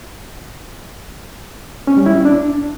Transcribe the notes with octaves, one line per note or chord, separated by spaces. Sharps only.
C#4
G3
E4
C#4
D4